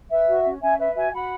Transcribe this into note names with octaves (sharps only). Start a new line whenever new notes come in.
B4 E5
F#4
C#4
C#4 E5 G#5
B4 E5
F#4 E5 G#5
F#4 F#5 B5